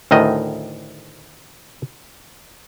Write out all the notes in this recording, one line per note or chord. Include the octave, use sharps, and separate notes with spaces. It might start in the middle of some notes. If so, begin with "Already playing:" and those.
D2 A2 D#3 D#5